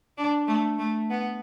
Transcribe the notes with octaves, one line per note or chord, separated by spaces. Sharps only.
D4
A3
A3
B3